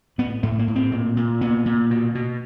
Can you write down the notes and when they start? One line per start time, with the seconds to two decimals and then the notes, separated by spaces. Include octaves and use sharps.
0.18 A2 B3
0.43 A2 A3
0.59 A#3
0.68 A2
0.75 C4
0.92 A#2
1.17 A#2
1.41 A#2 B3
1.66 A#2
1.90 B2
2.15 B2